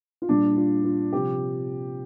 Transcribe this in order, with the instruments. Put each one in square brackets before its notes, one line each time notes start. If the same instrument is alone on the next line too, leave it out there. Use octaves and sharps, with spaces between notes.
[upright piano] F4
A#2 G3 D4
F4
F4
C3 F3 G4